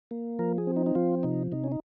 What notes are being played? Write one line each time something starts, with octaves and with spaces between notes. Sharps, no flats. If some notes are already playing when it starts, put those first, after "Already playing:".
A#3
F3 A#4
G#4
C4
D#4
D#4
F3 F4
C3 D#4
C3 D#4
C#4
D#4